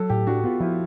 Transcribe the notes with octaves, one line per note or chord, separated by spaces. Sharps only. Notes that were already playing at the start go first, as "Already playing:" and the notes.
Already playing: F#3 A4
A2 G4
D4 F#4
B3 F4
F3 E4